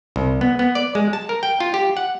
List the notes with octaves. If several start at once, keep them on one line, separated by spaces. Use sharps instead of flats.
C2
B3
B3
D5
G#3
A5
A#4
G5
F4
G4
F#5